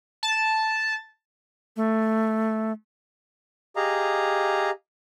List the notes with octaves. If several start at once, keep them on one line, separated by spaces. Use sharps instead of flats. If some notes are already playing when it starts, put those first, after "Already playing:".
A5
A3
G4 G#4 D#5 F5 A#5